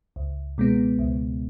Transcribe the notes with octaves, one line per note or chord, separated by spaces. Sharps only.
C#2
B2 G#3 B3
C#2